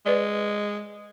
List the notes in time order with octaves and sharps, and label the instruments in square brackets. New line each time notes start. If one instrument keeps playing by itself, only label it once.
[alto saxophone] G#3 [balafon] B4 D5